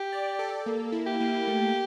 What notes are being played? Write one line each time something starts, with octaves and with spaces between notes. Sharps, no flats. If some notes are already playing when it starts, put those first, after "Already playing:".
Already playing: G4
D5
A4
A#3
E4
G4
A#3
A3